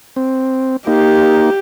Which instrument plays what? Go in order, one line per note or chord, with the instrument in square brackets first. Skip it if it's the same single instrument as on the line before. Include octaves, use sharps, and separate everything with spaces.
[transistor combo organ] C4
[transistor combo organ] A#3 D#4 [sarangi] G4